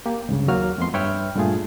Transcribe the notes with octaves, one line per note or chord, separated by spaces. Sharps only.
A#3 G4
C#2 G2 C#3
D#2 F#3 A#3 F#4 F6
F2 A3 B3 C6
G2 B4 C#5 E5 G5 F6
G2 A#2 A3 F4 G#4